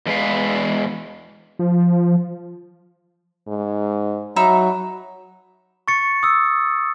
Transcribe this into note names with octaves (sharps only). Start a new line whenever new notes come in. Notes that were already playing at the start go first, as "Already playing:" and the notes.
E2 G#3 B4 F5
F3
G#2
F#3 D#4 E5 B5
C#6 A6 C#7
D#6 E6